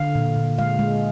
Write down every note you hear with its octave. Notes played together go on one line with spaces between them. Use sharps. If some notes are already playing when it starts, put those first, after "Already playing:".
Already playing: D3 F5
A#2
A#2
G#3 F5
G#3